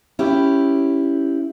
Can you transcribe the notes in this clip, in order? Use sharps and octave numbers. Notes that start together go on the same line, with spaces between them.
C#4 E4 G4